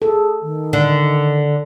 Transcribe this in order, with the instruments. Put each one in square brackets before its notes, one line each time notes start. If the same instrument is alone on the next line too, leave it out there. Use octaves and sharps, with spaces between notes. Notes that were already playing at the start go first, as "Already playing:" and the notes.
[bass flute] G#4 [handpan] A4
[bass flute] D#3
[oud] D3